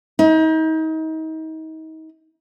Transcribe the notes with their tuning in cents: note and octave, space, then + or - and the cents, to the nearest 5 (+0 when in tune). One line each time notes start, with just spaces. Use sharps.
D#4 +35